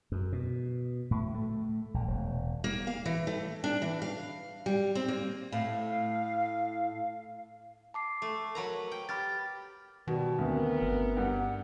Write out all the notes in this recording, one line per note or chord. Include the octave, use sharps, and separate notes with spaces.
F#2
B2
A2
A3
A#1
E1
A#3
F5
E3
A3
D4
E3
F5
G3
C4
A#3
A2 F5
A5 D6 C7
A3
F#3 A#4 B4 A#5
G5
G4 B5 F6 A6
B2 D#3 G3
D2 B3 C4 A#4
G1
G2 F#5